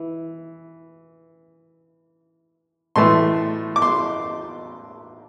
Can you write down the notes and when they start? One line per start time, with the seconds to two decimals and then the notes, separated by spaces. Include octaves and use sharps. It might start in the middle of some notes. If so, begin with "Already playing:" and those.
Already playing: E3
2.96 A2 E3 A3 C6
3.76 D6
3.82 C6